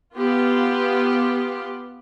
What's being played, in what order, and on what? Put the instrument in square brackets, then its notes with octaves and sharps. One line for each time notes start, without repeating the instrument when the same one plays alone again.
[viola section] B3 F4 G4